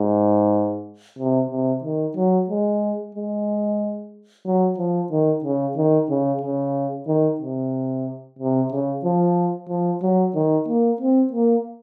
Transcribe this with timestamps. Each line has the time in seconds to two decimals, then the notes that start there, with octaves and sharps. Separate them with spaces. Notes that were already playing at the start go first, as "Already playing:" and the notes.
Already playing: G#2
1.19 C3
1.51 C3
1.84 D#3
2.17 F#3
2.50 G#3
3.15 G#3
4.46 F#3
4.78 F3
5.12 D#3
5.44 C#3
5.77 D#3
6.10 C#3
6.42 C#3
7.08 D#3
7.40 C3
8.39 C3
8.72 C#3
9.04 F3
9.69 F3
10.02 F#3
10.35 D#3
10.68 A#3
11.01 C4
11.33 A#3